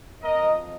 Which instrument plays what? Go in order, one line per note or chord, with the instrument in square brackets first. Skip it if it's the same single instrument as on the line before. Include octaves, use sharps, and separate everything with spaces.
[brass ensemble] F2 F3 A#4 D#5